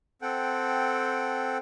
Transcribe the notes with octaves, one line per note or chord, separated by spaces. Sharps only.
C4 A4 F#5 G5